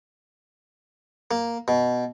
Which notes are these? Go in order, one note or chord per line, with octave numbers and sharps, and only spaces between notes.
A#3
B2